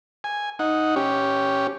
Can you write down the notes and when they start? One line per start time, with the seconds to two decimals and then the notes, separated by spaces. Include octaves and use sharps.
0.24 G#5
0.59 D#4 F#5
0.96 C#4 G4